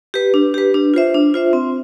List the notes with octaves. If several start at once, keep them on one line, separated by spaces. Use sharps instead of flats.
G4 B4
D4
G4 B4
D4
F4 C5 E5
D4
F4 C5 E5
C4